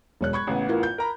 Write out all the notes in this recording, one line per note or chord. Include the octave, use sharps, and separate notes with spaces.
E1 C#5 F#6
B5 C#6 G#6
A1 C#3 B3
E4 F4 A#4
G6
A#4 A#5 B5